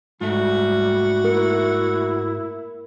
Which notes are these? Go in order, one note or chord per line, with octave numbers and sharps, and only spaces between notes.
G#2 G3 A3 F#4
E4 A#4